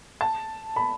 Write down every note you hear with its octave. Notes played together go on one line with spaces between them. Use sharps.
A5
B5